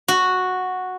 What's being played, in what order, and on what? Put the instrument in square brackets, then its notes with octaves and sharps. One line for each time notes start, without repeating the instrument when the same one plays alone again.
[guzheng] F#4